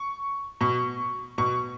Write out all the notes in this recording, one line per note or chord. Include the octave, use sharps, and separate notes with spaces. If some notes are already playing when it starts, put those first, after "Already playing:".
Already playing: C#6
B2 C#6
B2 C#6